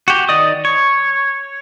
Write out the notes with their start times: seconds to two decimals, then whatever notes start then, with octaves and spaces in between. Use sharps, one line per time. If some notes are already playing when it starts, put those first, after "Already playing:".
0.08 F#4 G4
0.29 D#3 D5 D#5 D#6
0.65 C#5